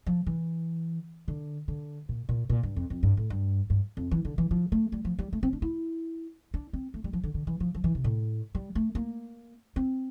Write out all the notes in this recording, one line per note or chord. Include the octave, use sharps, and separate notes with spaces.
F3
E3
D3
D3
A#2
A#2
A#2
G2
F2
F2
G2
A2
G2
G2
F2
E3
D3
E3
F3
A3
G3
F3
G3
A3
C4
D4
E4
D4
C4
A3
G3
F3
D3
D3
E3
F3
F3
E3
C3
A2
G3
A3
A#3
C4